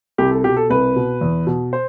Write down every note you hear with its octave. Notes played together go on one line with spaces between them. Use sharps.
C2 G4
A4
B2 G4
A4
C2 B4
B2
E2
B2
C5